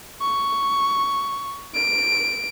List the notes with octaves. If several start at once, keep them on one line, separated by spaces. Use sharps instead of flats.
C#6
D7